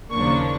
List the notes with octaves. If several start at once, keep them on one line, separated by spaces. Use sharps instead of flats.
D#2 C#3 F3 A#3 D4 C#6